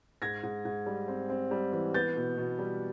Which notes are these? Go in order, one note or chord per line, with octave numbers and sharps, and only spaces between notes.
G#2 G#6 A#6
G#2
G#2
G3
C4
C4
G3
E3
B3 G6 A6
B2
B2
G3